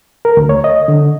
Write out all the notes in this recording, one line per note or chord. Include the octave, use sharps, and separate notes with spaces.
A#4
D2
C#5
D#5
D3